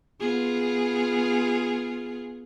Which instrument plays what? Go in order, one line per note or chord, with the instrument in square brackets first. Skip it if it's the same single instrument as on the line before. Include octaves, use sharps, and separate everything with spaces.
[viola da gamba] B3 F4 G#4